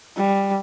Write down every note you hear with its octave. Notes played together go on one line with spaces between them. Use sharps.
G3